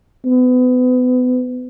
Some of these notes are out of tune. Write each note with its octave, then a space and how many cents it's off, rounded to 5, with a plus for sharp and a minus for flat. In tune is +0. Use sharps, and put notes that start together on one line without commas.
B3 +30